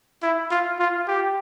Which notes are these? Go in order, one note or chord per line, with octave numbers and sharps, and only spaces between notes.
E4
F4
F4
G4